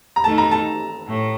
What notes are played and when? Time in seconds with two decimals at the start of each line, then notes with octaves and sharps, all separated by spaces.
0.16 A#5
0.24 D#3 A3 D#4 A4 A5
0.38 A#5
0.51 A5
1.07 A2 A3